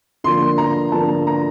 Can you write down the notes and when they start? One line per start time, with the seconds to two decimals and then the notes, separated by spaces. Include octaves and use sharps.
0.24 D3 F3 A#3 C6
0.58 A#5
0.92 D3 F3 A#3 A5
1.27 A#5